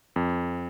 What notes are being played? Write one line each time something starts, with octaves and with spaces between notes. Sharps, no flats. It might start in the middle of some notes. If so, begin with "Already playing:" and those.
F2